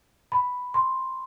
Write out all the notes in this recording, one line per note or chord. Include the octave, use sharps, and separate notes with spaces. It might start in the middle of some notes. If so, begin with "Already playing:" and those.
B5
C6